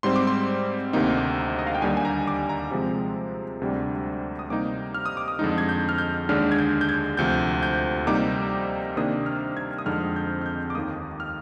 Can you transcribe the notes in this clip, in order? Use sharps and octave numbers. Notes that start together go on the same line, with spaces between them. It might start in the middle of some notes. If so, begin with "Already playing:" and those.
G#2 G3 C4 C6
D6
C6
D2 C3 D#3 A#3 D#4
D#5
F5
G5
D#2 D3 G3 A#3 D#4 G#5
G#5
A#5
D6
A#5
C3 F3 G#3 C4
D2 C3 G3 D4
D#6
C3 G3 A#3 D#4 D6
F6
D#6
D6
D#6
F2 D3 G#3 D#4
G#6
G6
F6
G6
D#2 D3 G#3 D4 F6
G#6
G6
G6
G#6
D2 C3 F3 G6
G6
C3 G3 A#3 D#4 D6
C3 D#3 A#3 D4 D#6
F6
G#6
D#6
F2 D3 G#3 C4 D#4 F6
G6
F6
G6
D6
D#2 D#3 A#3 D#6
F6